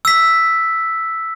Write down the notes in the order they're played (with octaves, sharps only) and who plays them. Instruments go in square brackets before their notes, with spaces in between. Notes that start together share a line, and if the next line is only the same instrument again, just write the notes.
[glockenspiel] E6 B6